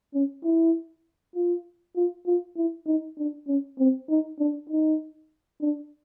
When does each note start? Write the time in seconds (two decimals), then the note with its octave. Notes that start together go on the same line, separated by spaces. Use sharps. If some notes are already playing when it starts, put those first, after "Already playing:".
0.14 C#4
0.44 E4
1.35 F4
1.96 F4
2.26 F4
2.57 E4
2.87 D#4
3.18 D4
3.48 C#4
3.79 C4
4.09 D#4
4.39 D4
4.69 D#4
5.61 D4